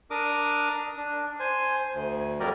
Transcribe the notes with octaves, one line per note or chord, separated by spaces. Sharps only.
D4 A#4 D6 D#6
D4
C5 G#5
D2
F2 F#3 G3 G4 A#4 D5